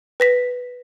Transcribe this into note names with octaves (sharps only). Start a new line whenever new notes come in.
B4 A#6 B6